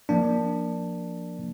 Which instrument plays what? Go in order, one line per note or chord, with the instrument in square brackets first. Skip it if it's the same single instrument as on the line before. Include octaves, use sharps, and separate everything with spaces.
[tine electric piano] F3 A#3 D4